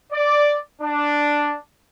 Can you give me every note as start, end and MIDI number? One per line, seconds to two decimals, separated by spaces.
0.13 0.55 74
0.81 1.54 62